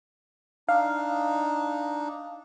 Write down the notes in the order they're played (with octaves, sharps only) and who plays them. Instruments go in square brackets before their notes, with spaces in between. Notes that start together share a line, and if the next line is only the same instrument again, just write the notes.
[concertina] D4 D#4 [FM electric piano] F5